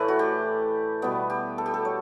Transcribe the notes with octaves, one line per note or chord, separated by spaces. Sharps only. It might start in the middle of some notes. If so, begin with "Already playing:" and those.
Already playing: A2 E3 A3 B4 D5
F#4
G4
B2 G3 B3
G4
A4
G4
A4
C#5